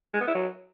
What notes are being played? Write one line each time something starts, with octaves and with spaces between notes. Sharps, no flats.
G#3
B3
E4
F#3